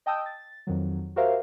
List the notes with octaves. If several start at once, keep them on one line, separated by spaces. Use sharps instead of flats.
D#5 G5 A5 D#6 E6 G6
A6
F2 D#3 F#3
F#4 G4 A#4 C5 E5 F5